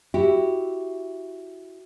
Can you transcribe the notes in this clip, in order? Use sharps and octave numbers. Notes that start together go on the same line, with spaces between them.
E4 F#4 G4